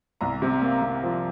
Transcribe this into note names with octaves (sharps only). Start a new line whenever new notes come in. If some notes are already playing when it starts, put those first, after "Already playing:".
C2 A#5
C3
A#3
C3
F3